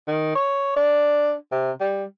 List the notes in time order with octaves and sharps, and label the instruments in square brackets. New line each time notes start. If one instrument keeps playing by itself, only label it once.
[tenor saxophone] D#3
C#5
D4
C3
G3